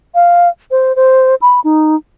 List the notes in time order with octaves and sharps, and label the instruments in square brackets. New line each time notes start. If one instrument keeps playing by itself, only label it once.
[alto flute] F5
C5
C5
B5
D#4